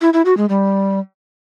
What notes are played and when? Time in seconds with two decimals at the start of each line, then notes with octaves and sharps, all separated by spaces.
0.01 E4
0.13 E4
0.25 F#4
0.37 G#3
0.49 G3